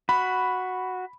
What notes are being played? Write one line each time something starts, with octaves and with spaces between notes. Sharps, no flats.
F#4 B5